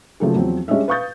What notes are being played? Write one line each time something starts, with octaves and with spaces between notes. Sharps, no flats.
C#3 F3 F#3 A3 A#3 G#4
E2 F3 F#3 C4
G3 G#3 C#4 D4 D#5 E5
B4 F5 C#6 D#6 G6 A6